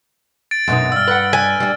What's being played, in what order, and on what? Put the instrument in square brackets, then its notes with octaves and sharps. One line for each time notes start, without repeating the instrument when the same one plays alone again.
[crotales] A6 D7
[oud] F#2 B2 B3 [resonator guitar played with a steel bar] G#3 D#4
[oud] G2 [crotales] E6 F6
[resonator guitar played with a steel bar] B4 F#5
[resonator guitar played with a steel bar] B4 D5 [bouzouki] G#5
[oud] G3 D4